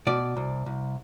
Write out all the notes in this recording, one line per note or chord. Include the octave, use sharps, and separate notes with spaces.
B2 D5
C2
C2